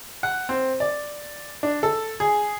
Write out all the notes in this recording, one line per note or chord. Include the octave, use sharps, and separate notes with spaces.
F#5
C4
D5
D4
A4
G#4